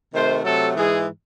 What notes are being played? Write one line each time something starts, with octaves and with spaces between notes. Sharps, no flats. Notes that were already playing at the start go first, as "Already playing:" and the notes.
C3 D#3 A3 C5
C3 F#3 A3 A4
G#2 E3 G#3 G#4